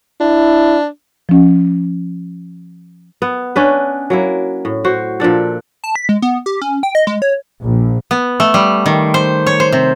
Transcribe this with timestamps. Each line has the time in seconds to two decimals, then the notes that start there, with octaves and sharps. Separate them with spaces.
0.21 D4 E4
1.29 F3 C#4
3.22 B3
3.56 C#4 D4 B4
4.10 F#3 A#3 E4
4.65 A2
4.84 F#4 C5
5.20 A#2 F3 D4 A4
5.84 A5
5.96 B6
6.09 G#3
6.22 B3
6.46 G4
6.61 C#4
6.83 G5
6.95 D#5
7.07 G#3
7.22 C#5
7.61 A#1
8.11 B3
8.40 A3
8.54 G3
8.86 D#3
9.14 C5
9.47 C#5
9.60 C5
9.72 C3